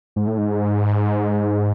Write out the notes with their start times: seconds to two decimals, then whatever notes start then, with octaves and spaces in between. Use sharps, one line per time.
0.16 G#2
0.27 A2
0.38 G#2